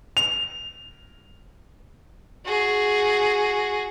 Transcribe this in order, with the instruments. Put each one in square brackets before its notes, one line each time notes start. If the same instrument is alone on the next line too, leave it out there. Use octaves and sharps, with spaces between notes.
[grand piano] F7
[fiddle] F#4 G#4